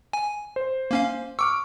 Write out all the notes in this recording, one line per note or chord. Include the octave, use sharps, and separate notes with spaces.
G#5
C5
A#3 C#4 F5
C#6 D6 E6 F6